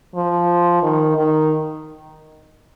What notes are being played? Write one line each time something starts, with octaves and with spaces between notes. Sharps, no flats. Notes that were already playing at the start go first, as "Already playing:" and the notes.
F3
D#3
D#3